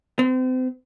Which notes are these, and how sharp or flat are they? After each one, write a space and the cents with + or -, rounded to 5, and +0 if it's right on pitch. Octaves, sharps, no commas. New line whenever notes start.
C4 -35